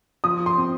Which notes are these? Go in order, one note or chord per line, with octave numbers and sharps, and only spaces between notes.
F3 D#6
C6
C4